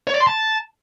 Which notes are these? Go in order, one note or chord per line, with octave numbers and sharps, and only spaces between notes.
C#5
D5
C6
A5